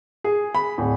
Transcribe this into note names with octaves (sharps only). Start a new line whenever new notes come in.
G#4
B5
D1